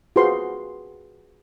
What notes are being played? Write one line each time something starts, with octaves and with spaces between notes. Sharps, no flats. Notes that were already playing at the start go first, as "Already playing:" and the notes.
F4 F#4 G#4 B4 C5 C6